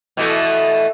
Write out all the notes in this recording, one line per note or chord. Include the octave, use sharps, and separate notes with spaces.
B2 E3 A3